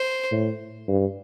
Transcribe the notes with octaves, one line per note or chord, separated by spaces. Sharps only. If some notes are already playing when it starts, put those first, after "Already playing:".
Already playing: C5
A2
G2